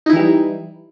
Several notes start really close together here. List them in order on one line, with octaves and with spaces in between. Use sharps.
D#4 E4 E3 G3